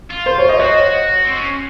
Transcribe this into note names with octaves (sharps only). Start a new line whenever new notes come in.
F4
C5
C#5
D#5
F#4 C#5
C4
C#4